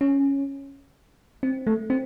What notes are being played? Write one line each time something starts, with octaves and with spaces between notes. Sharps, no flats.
C#4
C4
A3
C4